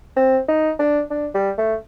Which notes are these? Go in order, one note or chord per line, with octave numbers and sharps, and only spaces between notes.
C4
D#4
D4
D4
G3
A3